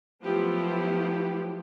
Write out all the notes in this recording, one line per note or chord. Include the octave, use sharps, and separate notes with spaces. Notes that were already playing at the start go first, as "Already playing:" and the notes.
F3 F#3 A3 B3 E4 G4